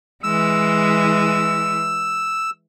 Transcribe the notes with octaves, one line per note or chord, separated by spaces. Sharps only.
E3 G#3 E6